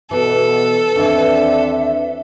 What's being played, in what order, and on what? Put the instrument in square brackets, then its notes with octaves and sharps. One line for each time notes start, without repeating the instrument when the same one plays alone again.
[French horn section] B2 [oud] E3 [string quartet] A4
[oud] D#2 E3 [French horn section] C4 D4 [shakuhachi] E5